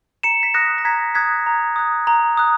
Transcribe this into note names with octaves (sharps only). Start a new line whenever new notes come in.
A#5 C#7 E7
B6
D#6 F#6 A#6 C#7
A#6
A#5 G#6 B6
D#6 F#6 G#6 B6
A#5
D#6 F#6
A#5
D#6 F#6